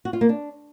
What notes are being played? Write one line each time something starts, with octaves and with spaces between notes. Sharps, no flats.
F#4
F4
A#3
D4